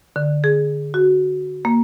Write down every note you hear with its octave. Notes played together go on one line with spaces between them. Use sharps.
D3
G#4
F#4
A#3